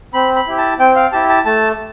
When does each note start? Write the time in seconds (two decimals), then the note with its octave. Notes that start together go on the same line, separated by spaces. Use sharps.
0.14 C4 B5
0.36 B5
0.47 E4 G4
0.58 A5
0.79 C4 G5
0.96 F5
1.12 E4 G4 A5
1.29 A5
1.45 A3 A5